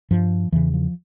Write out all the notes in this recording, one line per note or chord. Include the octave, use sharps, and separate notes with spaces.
G2 F3
E2 C#3 E3
F3